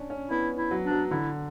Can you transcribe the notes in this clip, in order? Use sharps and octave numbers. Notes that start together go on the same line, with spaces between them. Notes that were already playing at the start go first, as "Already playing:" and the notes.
Already playing: C#4 D4
C#4
B3 E4
E4
F#3
D4
F#3
D3 E4